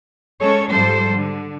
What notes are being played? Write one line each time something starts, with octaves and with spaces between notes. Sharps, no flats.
G#3 C#4 A4 C#5
G#2 F3 G3 A4 C5
D3